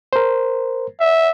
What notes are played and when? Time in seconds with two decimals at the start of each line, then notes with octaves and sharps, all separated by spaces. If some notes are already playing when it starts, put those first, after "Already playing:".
0.13 A#4 C5
1.00 E5